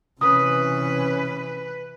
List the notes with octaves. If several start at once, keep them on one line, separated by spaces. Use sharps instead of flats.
C3 E3 C#4 B4 D#6